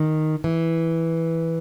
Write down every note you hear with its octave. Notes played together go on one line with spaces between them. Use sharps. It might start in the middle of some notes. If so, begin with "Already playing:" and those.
Already playing: D#3
E3